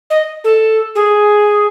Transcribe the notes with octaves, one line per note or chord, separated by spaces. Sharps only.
D#5
A4
G#4